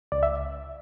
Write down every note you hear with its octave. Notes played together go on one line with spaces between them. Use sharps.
C#2 D5
E5